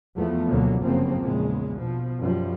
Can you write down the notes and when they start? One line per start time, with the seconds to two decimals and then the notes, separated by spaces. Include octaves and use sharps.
0.15 E2 F3 A3 B3
0.48 D2 B2 D3 F#3 A#3
0.82 G1 F#2 C#3 F3 A#3 C4
1.22 A#1 E2 C#3 G#3
1.77 B2 F3
2.18 F#2 F3 G3